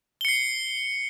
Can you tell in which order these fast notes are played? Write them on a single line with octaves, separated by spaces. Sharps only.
G7 C#7 C7